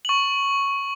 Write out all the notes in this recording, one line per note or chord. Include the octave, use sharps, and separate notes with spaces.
C#6 F#7